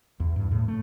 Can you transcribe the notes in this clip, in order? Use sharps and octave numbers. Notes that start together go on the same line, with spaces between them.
E2
G2
A2
A3